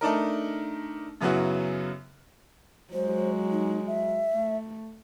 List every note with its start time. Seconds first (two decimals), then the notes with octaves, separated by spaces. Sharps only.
0.01 A3 D4 D#4 A#4
1.21 F#2 C#3 F#3 B3 E4 F#4
2.93 F#3 G#3 C5
3.51 D#4
3.87 E5
4.33 A3